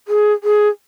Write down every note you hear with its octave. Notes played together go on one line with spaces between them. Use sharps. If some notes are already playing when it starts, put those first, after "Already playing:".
G#4
G#4